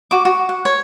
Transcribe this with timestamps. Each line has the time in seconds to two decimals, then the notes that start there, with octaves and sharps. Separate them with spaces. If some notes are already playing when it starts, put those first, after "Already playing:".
0.11 F#4 D6
0.25 F#4
0.49 F#5
0.65 C#5